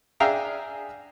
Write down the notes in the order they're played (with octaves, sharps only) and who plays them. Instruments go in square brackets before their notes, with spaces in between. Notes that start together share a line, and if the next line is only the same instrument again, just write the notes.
[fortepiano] D4 G#4 E5 F5 G5 A#5